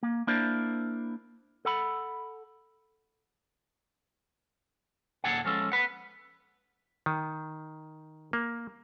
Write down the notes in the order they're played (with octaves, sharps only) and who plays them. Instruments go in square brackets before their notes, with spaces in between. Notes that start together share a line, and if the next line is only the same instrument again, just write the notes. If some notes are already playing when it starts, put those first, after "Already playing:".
[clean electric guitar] A#3
A#3 D4 E4 A#4 C5 D5
A4 F#5 B5
D#2 A#2 G#4 A4 F#5
F3 G#3 C#4 A4
B4 F#5
[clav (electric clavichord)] D#3
A#3